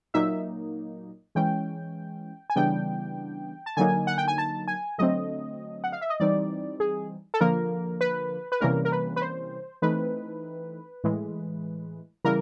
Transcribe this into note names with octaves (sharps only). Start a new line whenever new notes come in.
A#2 F#3 A#3 D#4 E5
E3 G#3 C#4 G5
G#5
C#3 E3 G3 B3 D4 G5
A5
D3 F#3 A#3 D#4 G#5
F#5
G5
G#5
A5
G#5
D3 F#3 A3 C4 D#5
F#5
F5
E5
D#5
E3 G3 C4 D#4 D5
G#4
A4
D3 F3 A#3 A#4
B4
B4
C3 E3 G3 A#3 C#4 A#4
A#4
B4
B4
C5
E3 A3 C4 D#4 B4
A2 E3 G#3
C#3 E3 G3 A#3 A#4